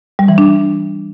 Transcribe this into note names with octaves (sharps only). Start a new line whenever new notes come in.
G3
E3
D4